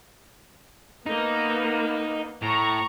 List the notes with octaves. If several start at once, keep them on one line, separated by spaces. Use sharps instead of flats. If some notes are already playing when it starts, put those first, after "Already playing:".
A#3 B3 D#4
A2 A#5 C#6